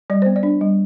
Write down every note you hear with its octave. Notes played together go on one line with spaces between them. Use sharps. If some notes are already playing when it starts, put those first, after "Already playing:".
G3 D5
B3 C5
D5
D4
G3